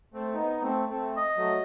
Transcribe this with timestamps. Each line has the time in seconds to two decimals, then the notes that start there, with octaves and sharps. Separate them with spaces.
0.14 A3 C4
0.34 B3 D#4
0.61 A3 C4
0.89 A3 C4
1.17 D#5
1.37 F#3 A3